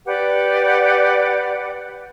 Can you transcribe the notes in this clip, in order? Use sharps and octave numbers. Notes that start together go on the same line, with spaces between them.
G4 B4 D5 F#5